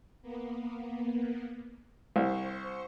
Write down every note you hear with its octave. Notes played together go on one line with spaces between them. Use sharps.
A#3 B3
C2 C5 C#6